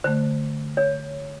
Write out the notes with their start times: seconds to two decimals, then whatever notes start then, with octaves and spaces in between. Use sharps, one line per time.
0.04 D3 A3 C5
0.77 C#5